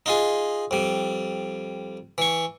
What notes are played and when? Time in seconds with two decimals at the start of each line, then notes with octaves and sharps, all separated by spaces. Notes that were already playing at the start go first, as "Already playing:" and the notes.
0.06 D#4 F4 G#4
0.71 F2 G3
2.18 E3 C#6